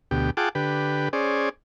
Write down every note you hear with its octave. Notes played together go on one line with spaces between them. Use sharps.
D2 B2 G4
F4 G#4 F#5 G5 A5 D6
D3 G4 B4
C#4 G#4 C5 D5